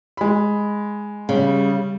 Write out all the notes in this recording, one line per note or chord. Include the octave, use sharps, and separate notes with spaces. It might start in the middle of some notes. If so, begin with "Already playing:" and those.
G#3 B5
C#3 G3